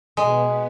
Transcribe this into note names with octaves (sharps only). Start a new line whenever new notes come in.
B2 G#3 B3